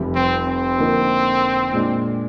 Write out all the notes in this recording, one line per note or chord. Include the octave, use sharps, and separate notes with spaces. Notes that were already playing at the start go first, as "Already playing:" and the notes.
Already playing: F1 F2 C3 G3
C4
C4
D3 F3 A#3 D#4 A#4
A#2 G#3 D4